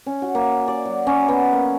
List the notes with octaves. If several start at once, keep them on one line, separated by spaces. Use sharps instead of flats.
C#4
F#4
A#3
D5
F#3
C#4
B3
A#3